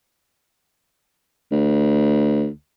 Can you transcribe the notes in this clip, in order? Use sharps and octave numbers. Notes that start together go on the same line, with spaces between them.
D2